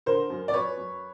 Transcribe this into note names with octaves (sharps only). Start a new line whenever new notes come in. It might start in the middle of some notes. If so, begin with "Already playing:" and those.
D3 A#4 C5
F#2
D5
F#2 B4 C#5
F#2